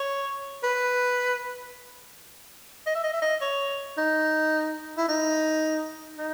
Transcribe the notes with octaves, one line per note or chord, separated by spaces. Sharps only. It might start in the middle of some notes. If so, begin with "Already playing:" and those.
Already playing: C#5
B4
D#5
E5
D#5
E5
D#5
C#5
D#4
E4
D#4
D#4